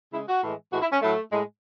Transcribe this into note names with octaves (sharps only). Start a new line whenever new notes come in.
C#3 G#3 E4
F#4
A2 E3 G#3
A2 E3 G#3 F#4
E4
C#4
A2 F#3 A3
A2 G#3